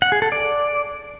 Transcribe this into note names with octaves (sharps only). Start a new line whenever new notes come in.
F#5
G#4
A4
D5